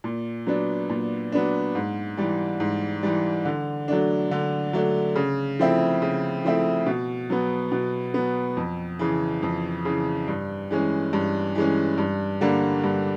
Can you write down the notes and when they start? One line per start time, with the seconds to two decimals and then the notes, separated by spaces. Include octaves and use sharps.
0.04 A#2
0.47 F#3 B3 D4
0.90 A#2
1.32 F#3 B3 D4
1.75 G#2
2.17 E3 G3
2.60 G#2
3.03 E3 G3
3.45 D3
3.88 F#3 A3 D4
4.31 D3
4.73 F#3 A3 D4
5.15 C#3
5.59 F3 A3 C4 E4
6.02 C#3
6.44 F3 A3 C4 E4
6.86 B2
7.30 F#3 B3
7.72 B2
8.14 F#3 B3
8.57 F2
8.99 C#3 E3
9.43 F2
9.85 C#3 E3
10.28 G2
10.71 E3 G#3 C#4
11.13 G2
11.55 E3 G#3 C#4
11.98 G2
12.41 D3 G3 A#3 D4
12.84 G2